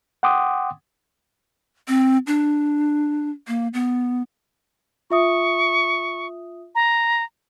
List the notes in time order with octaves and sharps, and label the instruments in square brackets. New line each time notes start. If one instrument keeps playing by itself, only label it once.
[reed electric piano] F#5 G5 C6 D6 D#6
[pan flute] C4
D4
A#3
B3
[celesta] F4 E5 D#6 [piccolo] C#6
[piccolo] A#5